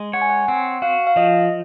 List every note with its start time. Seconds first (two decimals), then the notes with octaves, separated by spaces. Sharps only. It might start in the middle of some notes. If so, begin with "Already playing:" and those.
Already playing: G#3
0.13 C#5 F#5
0.22 G#5
0.30 F#5
0.48 C4 F#5
0.82 F#4 F5
1.07 F5
1.16 F3 D#5